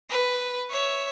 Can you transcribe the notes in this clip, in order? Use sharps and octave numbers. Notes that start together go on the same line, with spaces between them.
B4
C#5 E5